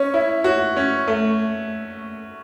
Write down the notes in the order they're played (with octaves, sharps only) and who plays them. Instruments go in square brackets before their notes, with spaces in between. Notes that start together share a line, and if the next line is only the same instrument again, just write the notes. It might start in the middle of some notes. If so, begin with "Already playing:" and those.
Already playing: [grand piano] C#4 [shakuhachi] C#5
[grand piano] E4
F#4
C#4
A3